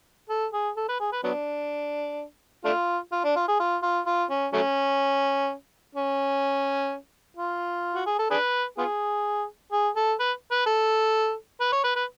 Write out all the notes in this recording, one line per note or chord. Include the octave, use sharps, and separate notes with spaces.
A4
G#4
A4
B4
G#4
B4
F#3 B3 D4
A3 D4 F4
F4
D4
F4
G#4
F4
F4
F4
C#4
F#3 A3 C#4
C#4
F4
F#4
G#4
A4
D4 G#4 B4
B3 F4 G#4
G#4
A4
B4
B4
A4
B4
C#5
B4
B4